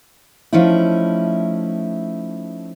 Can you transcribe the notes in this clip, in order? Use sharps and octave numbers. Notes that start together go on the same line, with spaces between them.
F3 A3 C#4 D#4 E4